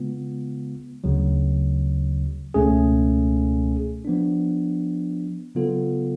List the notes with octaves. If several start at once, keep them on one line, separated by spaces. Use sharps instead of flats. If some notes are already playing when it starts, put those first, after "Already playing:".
Already playing: C#3 G#3 B3 F4
D2 C#3 F#3
C#2 B2 A3 C#4 G#4
F3 B3 D4
C#3 F#3 B3 F4 A4